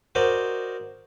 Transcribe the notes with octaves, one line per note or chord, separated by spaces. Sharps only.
F#4 A#4 C5 D5 D#5